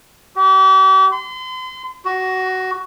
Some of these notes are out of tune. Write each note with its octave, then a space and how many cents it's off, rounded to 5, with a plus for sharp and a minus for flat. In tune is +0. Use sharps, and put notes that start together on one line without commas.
G4 -40
C6 -35
F#4 +15